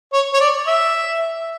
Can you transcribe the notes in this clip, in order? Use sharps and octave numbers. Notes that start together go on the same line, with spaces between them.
C#5
C#5
D5
E5